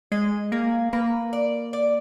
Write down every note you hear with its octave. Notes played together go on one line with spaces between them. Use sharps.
G#3 D#5
A#3 G#4
A#3 B4
D5
D5